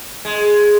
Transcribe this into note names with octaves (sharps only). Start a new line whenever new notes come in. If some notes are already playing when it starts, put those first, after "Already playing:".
G#3